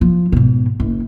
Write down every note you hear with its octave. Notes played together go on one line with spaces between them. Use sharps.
F3
G#2 B2
F#1